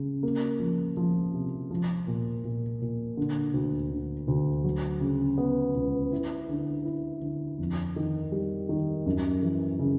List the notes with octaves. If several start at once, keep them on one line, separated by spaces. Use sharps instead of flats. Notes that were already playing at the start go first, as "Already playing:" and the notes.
Already playing: C#3
A#3
F3
F3
C3
F3
A#2
A#2
A#2
D3
D2
D3
D2
F#3
C#3
B3
C#2
E4
D3
E4
D3
F2
D#3
G3
D#3
F#2
E3
C#3